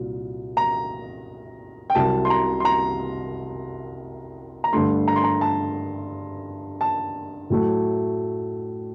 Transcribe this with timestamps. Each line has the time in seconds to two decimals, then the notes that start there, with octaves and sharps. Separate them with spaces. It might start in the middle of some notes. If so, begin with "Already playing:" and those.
Already playing: C2 A#2 F#3
0.57 A#5
1.90 G5
1.95 C2 C3 F#3 A5
2.25 C6
2.30 A#5
2.60 C6
2.65 A#5
4.64 A#5
4.73 G2 D3 A3 C6
5.08 A#5
5.16 C6
5.24 A#5
5.41 A5
6.81 A5
7.50 A2 F#3 A3